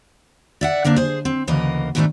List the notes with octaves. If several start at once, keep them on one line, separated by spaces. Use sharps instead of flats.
D5 E5 F#5
D3 A#3 C4 D4
G#4 C5
C4
D2 C#3 E3 A#3 D#5
G#2 B2 D#3 E3 A3 D4